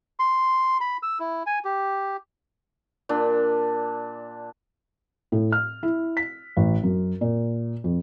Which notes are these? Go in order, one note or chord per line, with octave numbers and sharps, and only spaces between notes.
C6
B5
E6
E4
G#5
G4
A#2 D4
A2
F6
E4
B6
A1
F#2
A#2
F2